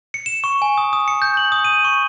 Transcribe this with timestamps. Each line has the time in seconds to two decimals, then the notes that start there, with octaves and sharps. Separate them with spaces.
0.14 C#7
0.26 E7
0.44 C#6
0.62 G#5
0.78 D#6
0.93 D#6
1.08 C#7
1.22 G6
1.37 F#7
1.52 D#6
1.64 D#7
1.85 C#6